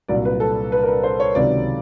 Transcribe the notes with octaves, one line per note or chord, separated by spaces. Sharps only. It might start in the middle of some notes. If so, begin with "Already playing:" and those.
C2 A#2 F#3 D5
B4
A4
B4
A#4
B4
C5
C#5
C#2 C3 D#3 F#3 D5